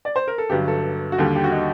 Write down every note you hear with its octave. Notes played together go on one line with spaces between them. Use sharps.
D5
C5
A#4
A4
G1 G2 F#3 G4
A4
F#4
D#2 D3 G3 G4
G4
F#4
D#4